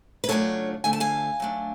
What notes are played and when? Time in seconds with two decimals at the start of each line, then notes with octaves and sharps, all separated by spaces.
0.24 B4
0.29 C#3 F#3 A3 D4 F4 A4 C#5
0.84 D3 F3 A3 D4 G#5
0.93 A5
1.00 F5 G#5
1.40 F#3 A3 D4